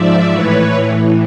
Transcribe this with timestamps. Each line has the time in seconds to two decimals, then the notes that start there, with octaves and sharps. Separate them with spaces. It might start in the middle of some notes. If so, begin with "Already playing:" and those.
Already playing: G#2 F3 D5 E5
0.29 A2 E3 B4 C#5
0.74 A2 E3